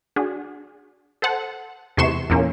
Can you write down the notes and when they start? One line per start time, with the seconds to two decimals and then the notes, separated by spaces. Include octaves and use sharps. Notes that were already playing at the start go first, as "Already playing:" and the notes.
0.16 D4 F#4 G#4
1.22 A4 C5 F#5 A5
1.97 E2 C3 A3 C6 C#6 E7
2.30 E2 A#2 A#3 C#4